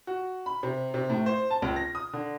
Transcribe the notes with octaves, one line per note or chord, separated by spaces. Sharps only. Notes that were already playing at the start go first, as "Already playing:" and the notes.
F#4
B5
C3
C3
A2
C5
A5
C#2
A#6
D#6
D3